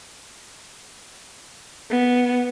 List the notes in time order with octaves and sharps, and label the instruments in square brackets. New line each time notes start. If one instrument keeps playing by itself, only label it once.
[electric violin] B3